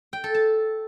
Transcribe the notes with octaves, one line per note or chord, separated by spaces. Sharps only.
G5
A4
A5